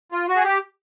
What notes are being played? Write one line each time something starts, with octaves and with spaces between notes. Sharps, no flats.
F4
F#4
G#4
G4